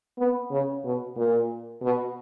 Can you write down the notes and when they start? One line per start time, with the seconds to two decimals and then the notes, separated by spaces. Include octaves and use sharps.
0.18 B3
0.51 C#3
0.84 B2
1.16 A#2
1.82 B2